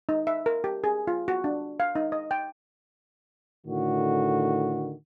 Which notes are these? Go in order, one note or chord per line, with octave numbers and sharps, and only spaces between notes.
D#4
E5
A#4
G4
G#4
F4
F#4
D4
F5
D#4
D#5
G5
A2 D3 D#3 F#4